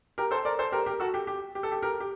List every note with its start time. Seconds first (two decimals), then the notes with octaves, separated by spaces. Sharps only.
0.18 G4 A#4
0.31 A4 C5
0.45 A#4 D5
0.59 A4 C5
0.72 G4 A#4
0.86 G4 A#4
1.00 F#4 A4
1.14 G4
1.27 G4
1.55 G4
1.63 A4
1.72 G4
1.82 G4 A#4
2.00 G4